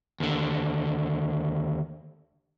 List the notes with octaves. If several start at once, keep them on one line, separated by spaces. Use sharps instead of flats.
D#2 D3